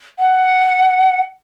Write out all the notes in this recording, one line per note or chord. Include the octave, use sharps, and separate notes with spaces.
F#5